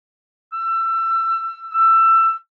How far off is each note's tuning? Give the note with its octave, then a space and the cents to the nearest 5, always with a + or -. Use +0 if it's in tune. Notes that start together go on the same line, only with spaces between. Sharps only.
E6 +25
E6 +20